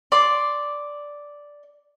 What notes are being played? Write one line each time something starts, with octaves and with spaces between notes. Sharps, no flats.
D5 C6